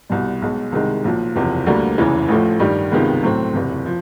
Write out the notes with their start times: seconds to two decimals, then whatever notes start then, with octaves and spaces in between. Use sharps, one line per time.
0.09 C2 B2 G3
0.42 B1 B2 G#3
0.72 C2 C3 D#3 G#3
1.04 B1 A#2 F3
1.35 F#1 E2 C3 F3
1.67 D2 D3 G3 A#3
1.98 F1 E2 C#3 E3
2.28 A1 A2 F3 A3
2.60 G2 D#3 G3
2.92 C#2 C3 D#3 G#3 B3
3.23 A2 F#3 A3 C4
3.54 F#1 E2 C3
3.86 F3